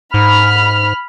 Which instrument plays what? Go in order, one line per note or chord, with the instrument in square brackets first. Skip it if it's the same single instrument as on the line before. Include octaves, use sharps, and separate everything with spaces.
[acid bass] G#2 [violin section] B5 F6